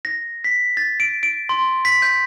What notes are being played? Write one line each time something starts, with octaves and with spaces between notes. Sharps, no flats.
A#6
B6
A6
D7
D7
C6
B6
G6